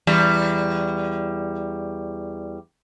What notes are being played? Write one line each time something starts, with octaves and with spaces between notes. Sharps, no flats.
E2 G3